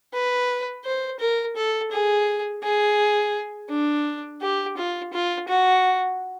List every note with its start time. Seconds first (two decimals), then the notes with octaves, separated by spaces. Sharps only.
0.13 B4
0.85 C5
1.20 A#4
1.56 A4
1.92 G#4
2.63 G#4
3.69 D4
4.41 G4
4.77 F4
5.13 F4
5.48 F#4